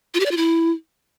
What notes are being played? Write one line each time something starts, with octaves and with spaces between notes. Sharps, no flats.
F4
G4
D5
F4
E4